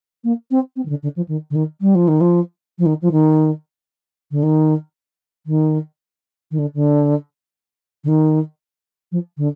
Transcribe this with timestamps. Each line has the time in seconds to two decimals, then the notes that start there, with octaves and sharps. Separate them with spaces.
0.24 A#3
0.50 C4
0.76 C4
0.85 D#3
0.89 D3
1.02 D3
1.16 F3
1.28 D#3
1.50 D3
1.55 D#3
1.81 G3
1.95 F3
2.07 D#3
2.20 F3
2.78 F3
2.85 D#3
3.01 F3
3.11 D#3
4.31 D3
4.42 D#3
5.46 D#3
6.51 D#3
6.58 D3
6.74 D3
8.04 D3
8.08 D#3
9.11 F3
9.37 D3